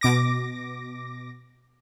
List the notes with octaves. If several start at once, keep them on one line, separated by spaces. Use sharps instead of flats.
B2 D6 A#6